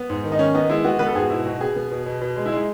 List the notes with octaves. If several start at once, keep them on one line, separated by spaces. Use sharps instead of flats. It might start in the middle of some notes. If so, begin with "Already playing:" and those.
Already playing: B3
G#2
D#3
D#4
D#3 C#4
B3 D#4
G#3 E4
B3 F#4
B3 B4
A4
G#2 G#4
F#4
B2 E4
B2 F#4
B2 G#4
B3
B2
B2
B2
G#3
E4
G#3 D#4